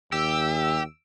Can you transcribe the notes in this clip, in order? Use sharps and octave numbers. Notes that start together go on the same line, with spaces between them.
D#2 G4 E6